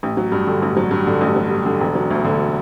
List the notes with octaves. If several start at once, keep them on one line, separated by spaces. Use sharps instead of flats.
A1
F#3
G2
D3
A1
F#3
G2
D3
A1
F#3
G2
D3
E1
F#3
D2
D3